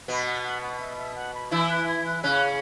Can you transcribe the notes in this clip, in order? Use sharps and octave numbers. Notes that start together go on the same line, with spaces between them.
B2 B3 F#5
F#5
F#5
F#5
E5
E5
F#5
B5
E3 E4 E6
F#6
G#6
F#6
C#3 C#4 F#6